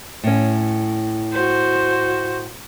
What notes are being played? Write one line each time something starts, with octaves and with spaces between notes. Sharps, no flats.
A2 C#4
F#4 C5